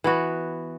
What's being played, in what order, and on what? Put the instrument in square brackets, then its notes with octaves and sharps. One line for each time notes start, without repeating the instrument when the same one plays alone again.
[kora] E3 B3 F#4